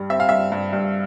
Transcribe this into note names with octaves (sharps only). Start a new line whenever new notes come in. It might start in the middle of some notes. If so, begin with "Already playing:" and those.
Already playing: G2 G3
C4 E5
F5
G2 E5
G2
G2